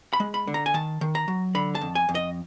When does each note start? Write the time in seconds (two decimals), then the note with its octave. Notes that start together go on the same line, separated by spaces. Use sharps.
0.13 B5
0.20 G#3
0.34 B5
0.47 D3
0.54 A#5
0.66 G#5
0.74 D#3 A5
1.01 D#3
1.15 A#5
1.28 F#3
1.55 D3 B5
1.75 A5
1.81 F2
1.95 G#5
2.09 F2
2.15 D#5